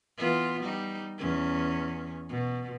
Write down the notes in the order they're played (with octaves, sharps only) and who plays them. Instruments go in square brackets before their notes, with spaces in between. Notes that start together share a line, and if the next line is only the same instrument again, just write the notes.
[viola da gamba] E3 B3 F4
G3 D#4
E2 C#4
B2